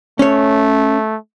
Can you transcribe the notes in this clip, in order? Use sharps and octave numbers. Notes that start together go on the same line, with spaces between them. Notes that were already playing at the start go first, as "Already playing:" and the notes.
A3 C#4 C#5